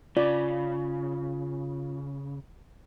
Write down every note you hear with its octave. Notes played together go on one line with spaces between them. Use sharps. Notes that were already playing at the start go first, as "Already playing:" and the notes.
C#3 F4 D5